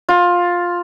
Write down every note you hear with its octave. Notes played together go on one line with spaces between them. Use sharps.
F4